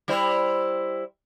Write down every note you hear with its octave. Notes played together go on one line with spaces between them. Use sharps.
G3 E4 C5